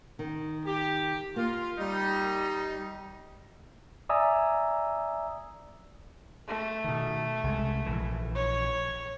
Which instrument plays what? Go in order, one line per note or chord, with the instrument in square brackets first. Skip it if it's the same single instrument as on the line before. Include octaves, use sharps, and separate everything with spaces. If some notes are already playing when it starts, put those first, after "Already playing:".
[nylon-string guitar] D#3
[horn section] G4
[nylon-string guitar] A#3 [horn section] F4
[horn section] G3 D#4
[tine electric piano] D5 E5 G#5 A#5 D#6 E6
[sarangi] A3
[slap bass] B2 D#3
C2 G#3
A#1 E3
[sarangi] C#5